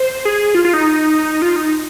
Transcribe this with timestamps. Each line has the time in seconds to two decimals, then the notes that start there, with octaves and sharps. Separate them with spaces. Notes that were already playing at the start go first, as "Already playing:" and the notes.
Already playing: C5
0.25 G#4
0.55 F4
0.65 F4
0.74 D#4
1.42 F4
1.56 D#4